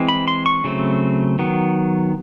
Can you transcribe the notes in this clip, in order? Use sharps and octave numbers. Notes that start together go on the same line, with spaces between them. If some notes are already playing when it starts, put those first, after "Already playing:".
Already playing: E3 G#3 C4
B5
C6
C#6
C#3 F#3 A3 C4
D#3 F#3 B3